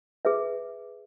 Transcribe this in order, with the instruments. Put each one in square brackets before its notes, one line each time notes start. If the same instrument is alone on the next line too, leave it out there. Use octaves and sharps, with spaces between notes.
[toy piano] G#4 B4 E5